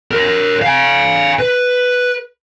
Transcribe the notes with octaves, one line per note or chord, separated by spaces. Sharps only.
A#4 C#5
F5 G#5
B4